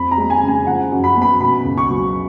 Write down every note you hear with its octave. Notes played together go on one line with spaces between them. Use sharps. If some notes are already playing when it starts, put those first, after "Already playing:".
Already playing: F2 B5
A#5
G#3
G#5
C#3
G#5
F3 F#5
F#2
B5
B3
B5
B2 B5
C#2
C#6
F#3